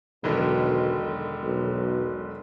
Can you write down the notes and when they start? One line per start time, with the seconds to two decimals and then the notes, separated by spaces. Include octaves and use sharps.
0.24 E1 B1 D3 D#3
1.43 B1